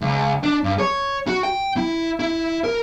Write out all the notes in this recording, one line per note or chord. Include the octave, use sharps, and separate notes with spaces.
C#2
D4
G2
C#5
F#4
G5
E4
E4
A#4